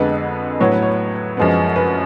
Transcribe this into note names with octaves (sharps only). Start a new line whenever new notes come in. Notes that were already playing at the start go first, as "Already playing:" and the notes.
Already playing: F2 D3 G#3 B3 B4
A2 F#3 B3 C#5
B4
C#5
F#2 F3 G#3 B3
B4